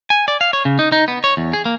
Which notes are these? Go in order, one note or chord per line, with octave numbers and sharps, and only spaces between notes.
G#5
D5
F5
C#5
C#3
D#4
D#4
B3
C#5
E2
G#4
A#3